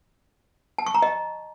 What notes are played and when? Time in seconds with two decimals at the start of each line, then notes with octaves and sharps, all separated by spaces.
0.78 A5
0.86 C#6
0.94 A#5
1.02 D#5